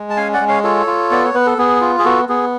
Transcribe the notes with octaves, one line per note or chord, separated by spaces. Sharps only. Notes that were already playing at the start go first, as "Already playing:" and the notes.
Already playing: G#3
A5
C#4 F5 G#5
D5 F#5
G#3
C#5 F5
F4 A4 C#5
F4
B3 D5
C#5
B3 B4
A4
B3 G#4
F4
G#4
B3 F#4 A4
B3 G#4